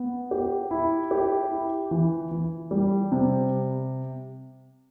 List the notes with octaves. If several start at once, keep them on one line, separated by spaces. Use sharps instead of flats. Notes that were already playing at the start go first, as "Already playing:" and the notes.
Already playing: B3
G4
E4
G4
E4
E3
E3
G3
C3